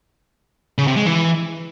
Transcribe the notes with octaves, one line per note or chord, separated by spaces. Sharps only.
C#3
C3
G#3
E3